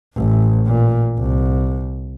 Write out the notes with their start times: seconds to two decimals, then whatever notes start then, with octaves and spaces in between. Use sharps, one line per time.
0.15 A1
0.67 A#2
1.18 C2